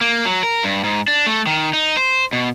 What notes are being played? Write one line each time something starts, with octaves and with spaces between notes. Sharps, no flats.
A#3
F#3
A#4
G2
G#2
D4
A3
D#3
D#4
C5
B2